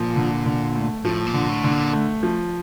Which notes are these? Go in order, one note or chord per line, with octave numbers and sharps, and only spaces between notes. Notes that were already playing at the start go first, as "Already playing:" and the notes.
Already playing: A#2 F3
D3
D3
A3
A2 F3
A#2
D3
A2
D3
A#2
A3
F3